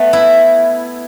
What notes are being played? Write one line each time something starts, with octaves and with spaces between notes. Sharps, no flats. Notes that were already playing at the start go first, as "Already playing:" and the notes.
Already playing: A3 B3
E4